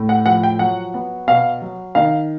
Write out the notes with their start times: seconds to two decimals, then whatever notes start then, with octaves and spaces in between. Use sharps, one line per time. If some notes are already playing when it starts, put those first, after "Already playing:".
Already playing: A2
0.09 F#5
0.26 F3 F#5
0.43 G5
0.59 F#3 F#5
0.94 B3
1.28 B2 F5
1.62 F#3
1.95 D#3 F5